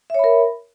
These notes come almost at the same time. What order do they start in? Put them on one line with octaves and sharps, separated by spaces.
E5 C#5 B5 A#4